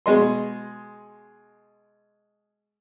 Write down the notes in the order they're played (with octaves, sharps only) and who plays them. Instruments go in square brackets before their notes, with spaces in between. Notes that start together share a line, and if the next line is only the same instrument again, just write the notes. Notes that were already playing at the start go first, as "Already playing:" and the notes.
[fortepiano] B2 G#3 D#5 C6